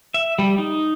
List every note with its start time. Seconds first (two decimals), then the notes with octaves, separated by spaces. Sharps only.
0.14 E5
0.39 G3
0.58 D#4